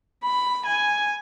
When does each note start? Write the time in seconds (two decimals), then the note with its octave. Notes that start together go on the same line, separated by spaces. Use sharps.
0.24 B5
0.66 G#5